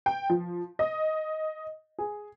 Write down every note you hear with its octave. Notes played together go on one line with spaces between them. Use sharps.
G5
F3
D#5
G#4